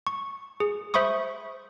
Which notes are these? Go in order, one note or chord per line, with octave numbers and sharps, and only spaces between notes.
C#6
G#4
C5 E5 B5 C#6 D#6